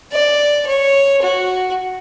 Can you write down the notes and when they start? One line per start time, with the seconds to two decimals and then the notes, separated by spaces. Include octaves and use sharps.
0.12 D5
0.66 C#5
1.22 F#4